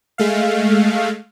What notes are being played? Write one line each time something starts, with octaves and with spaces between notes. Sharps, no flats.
G#3 A3 F5